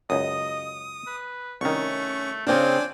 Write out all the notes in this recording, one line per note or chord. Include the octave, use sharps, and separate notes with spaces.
C#2 F#2 D#5 D#6
B4
C2 D#3 A3 C#4 C#6
C#3 C4 D4 F4 D5 G5 G#5